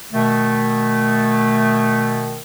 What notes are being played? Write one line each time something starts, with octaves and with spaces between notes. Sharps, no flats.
B2 D#3 A3